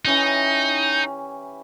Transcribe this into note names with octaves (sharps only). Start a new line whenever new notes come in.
E3 C#4 D#4 G4